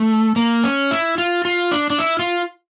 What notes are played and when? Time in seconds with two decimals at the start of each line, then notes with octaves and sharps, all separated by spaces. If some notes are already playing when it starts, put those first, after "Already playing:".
Already playing: A3
0.36 A#3
0.64 C#4
0.91 E4
1.18 F4
1.45 F4
1.71 D4
1.90 D4
1.99 E4
2.19 F4